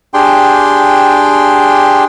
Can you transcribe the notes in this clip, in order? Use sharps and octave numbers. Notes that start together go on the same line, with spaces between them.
D4 G4 G#4 G5 C6